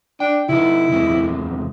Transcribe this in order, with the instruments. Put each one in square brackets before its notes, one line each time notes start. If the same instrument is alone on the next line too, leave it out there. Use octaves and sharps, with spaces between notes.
[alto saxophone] D4 [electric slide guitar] G5
[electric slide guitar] C3 D#4 [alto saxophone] E4
[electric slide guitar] E2 C3 G#3